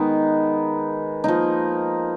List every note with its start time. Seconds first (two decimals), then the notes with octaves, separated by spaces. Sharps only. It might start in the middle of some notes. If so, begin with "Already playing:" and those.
Already playing: D#3 G#3 B3 D#4
1.24 F3 A#3 D#4